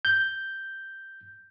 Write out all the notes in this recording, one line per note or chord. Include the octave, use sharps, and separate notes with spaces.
G6